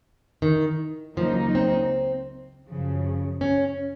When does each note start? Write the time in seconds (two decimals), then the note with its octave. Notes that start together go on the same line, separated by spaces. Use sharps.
0.42 D#3
1.17 C#2 C#3 F3 F#3 A#3 D#4
1.55 C4
2.67 F#2 C#3 F3
3.41 C#4